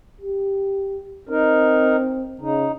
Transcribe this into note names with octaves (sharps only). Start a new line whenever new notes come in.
G4
C4 D#4 A#4
C#3 D#4